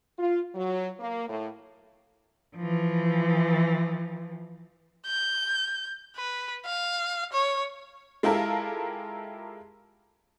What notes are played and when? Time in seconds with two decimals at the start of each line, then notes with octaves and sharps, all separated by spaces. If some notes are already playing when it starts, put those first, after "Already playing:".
0.18 F4
0.54 F#3
0.99 A#3
1.28 A2
2.57 E3 F3
5.06 G6
6.17 B4
6.66 F5
7.33 C#5
8.23 G#3 E4 F4 G4 A4 A#4